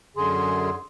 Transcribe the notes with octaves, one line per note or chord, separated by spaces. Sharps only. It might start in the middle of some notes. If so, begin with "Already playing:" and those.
F#2 D3 G#4 C6